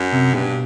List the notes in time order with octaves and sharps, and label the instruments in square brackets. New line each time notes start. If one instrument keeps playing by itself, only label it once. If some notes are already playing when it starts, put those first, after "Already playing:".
Already playing: [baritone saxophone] F#2
[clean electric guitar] C3
[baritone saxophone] G2 [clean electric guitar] B2